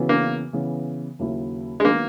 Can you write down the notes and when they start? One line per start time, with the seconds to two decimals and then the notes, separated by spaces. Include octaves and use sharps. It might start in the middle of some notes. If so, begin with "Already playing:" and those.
Already playing: C#3 E3 B3 F#4
0.09 A#3
0.53 C#3 E3 B3
1.19 D#2 C#3 F#3 A#3 E4
1.80 G#3
1.85 D#3 F#3 A#3 B3